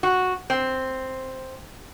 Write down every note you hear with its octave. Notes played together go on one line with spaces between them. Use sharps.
F#4
C4